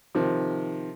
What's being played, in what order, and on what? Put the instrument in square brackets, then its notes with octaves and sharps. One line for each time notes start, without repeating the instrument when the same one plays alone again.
[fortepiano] C3 D#3 F3